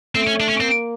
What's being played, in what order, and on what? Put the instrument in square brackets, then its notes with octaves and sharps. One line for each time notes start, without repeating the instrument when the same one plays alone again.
[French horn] A3 [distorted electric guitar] C4
[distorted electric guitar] C#4
D4
C#4
[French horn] A#3 [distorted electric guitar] C4